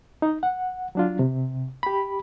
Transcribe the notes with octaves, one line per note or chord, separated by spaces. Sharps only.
D#4
F#5
F#3 D4 F4
C3
G4 B5